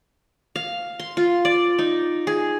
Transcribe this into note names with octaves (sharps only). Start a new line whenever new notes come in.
F5
C6
F4
D5
D#4
G#4